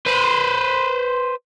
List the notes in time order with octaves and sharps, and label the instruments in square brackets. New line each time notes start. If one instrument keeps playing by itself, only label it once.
[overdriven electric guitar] B4 C5